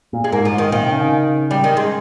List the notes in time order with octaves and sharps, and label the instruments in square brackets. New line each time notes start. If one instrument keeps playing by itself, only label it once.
[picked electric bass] A#2
[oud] G#3
[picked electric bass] G#2 [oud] A#3
[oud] F3
[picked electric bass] G#2
[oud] D#3
[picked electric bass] A#2 [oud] D#3
[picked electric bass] C3
C#3
C#3
[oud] G3
D#3
G#3